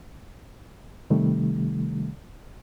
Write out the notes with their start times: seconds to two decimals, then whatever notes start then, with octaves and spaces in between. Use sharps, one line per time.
1.10 C3 D#3 G3 A3